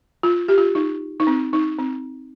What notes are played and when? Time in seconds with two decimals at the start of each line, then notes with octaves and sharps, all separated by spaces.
0.23 F4
0.48 G4
0.58 F4
0.75 D#4
1.20 D#4
1.27 C4
1.53 D#4
1.79 C4